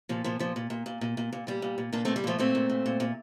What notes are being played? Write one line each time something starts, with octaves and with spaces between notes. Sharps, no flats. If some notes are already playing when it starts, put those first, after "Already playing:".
A#2 F3
A#2 F3
A#2 F3
A#2
A#2
A#2
A#2
A#2
A#2
A#2 G3
A#2
A#2
A#2 A#3 D4
A#2 A3 C4
G3
A#2 F3 A3
A#2 A3 C4
A#2
A#2
A#2
A#2